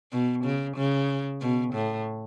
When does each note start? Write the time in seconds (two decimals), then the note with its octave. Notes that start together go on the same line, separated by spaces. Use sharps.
0.12 B2
0.44 C#3
0.77 C#3
1.41 B2
1.74 A2